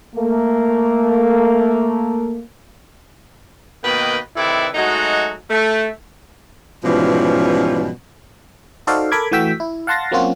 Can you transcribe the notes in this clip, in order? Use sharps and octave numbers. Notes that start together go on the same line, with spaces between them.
A3 A#3
B2 D#3 A#3 B4 D#5 G5
C3 D#3 E4 A4 B4 D5
F#3 G#3 A3 D#4 F#4
A3
G#2 B2 E3 F3 G3 C#4
D#4 F#4 A4 C5 D5 F5
A4 A#4 B5 D6 G#6
E3 A3 F#4 G5 E6 B6
E4
F5 F#5 A5 C6 A6 A#6
F#3 A#3 C4 C#4 F4 F#4